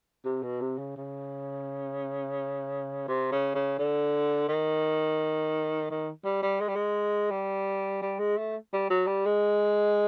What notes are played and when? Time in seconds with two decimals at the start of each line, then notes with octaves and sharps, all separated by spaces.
0.25 C3
0.43 B2
0.61 C3
0.78 C#3
0.96 C#3
3.08 C3
3.32 C#3
3.55 C#3
3.79 D3
4.48 D#3
5.91 D#3
6.25 G3
6.42 G3
6.61 G#3
6.68 G3
6.75 G#3
7.31 G3
8.02 G3
8.19 G#3
8.37 A3
8.73 G3
8.90 F#3
9.07 G3
9.26 G#3